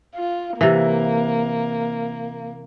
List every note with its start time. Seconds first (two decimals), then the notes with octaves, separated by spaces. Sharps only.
0.16 F4
0.61 C3 E3 A#3